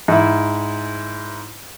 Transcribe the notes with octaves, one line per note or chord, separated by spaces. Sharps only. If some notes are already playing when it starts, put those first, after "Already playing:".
G#2 E4